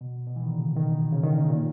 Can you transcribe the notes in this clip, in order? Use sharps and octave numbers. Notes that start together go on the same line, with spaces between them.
B2
B2
E3
D#3
A#2 C#3
B2 D#3
C#3
D#3
A#2 C#3
A#2